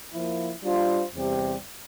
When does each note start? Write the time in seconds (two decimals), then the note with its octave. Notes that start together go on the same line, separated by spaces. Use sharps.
0.11 F3 A#3 E4
0.63 G3 D4 F4 C5
1.14 E2 C3 G3 C4 G4